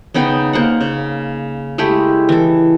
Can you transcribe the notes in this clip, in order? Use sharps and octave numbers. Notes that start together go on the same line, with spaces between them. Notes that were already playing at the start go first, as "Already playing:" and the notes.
C#3 B3 D#4 G5
A#3 C5 F#5
C#3
G#3 A3 E4 G4
E3 A4